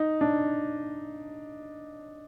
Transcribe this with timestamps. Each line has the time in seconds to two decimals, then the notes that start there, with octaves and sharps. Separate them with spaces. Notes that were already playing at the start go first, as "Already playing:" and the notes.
Already playing: D#4
0.21 D4